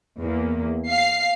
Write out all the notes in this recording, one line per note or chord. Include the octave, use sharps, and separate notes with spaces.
E2 A#3
F5 C7